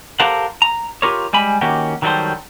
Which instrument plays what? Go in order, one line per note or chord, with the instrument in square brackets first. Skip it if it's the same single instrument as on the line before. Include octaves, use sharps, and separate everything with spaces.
[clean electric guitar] G4 A4 A#4 C5 F5 F#5
A#5
F4 G4 A#4 C#5
G3 G#3 G#5 B5
D#3 A#3 C#4 F#4 G4
D#3 F#3 G3 F4 A4 C5